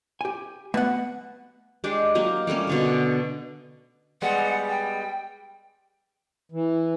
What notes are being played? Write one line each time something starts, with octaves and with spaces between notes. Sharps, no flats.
G4 G#5
B2 A3 B3 F#5
G#3 D4 G4
F#3 A#3 G4 D#5
G3 A3 A#3 C#4
B2 D3 C#4
G3 G#3 B3 F#5
G5
E3